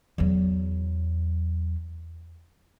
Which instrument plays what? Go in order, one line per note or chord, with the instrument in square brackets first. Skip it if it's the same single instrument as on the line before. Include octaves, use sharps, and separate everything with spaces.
[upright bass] E2 F#3